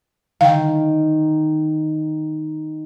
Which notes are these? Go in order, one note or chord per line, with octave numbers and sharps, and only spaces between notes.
D#3 F5 G5